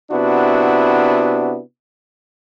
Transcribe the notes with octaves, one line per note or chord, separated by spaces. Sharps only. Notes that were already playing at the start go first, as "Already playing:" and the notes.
C3 B3 D4 E4 F#4